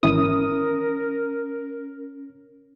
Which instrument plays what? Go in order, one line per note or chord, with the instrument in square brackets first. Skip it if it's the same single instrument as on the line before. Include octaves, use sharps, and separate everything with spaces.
[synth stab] G#1 E3 D#6 [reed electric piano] C#4 [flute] A#4